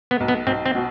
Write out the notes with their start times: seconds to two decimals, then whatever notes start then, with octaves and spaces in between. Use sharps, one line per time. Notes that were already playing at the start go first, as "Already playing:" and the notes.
0.11 B3
0.20 B1
0.28 B3
0.47 B1 C4
0.66 C4
0.75 B2